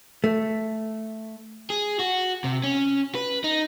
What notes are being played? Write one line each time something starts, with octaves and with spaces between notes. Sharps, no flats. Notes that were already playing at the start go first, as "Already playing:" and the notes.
A3
G#4
F#4
C3
C#4
B4
D#4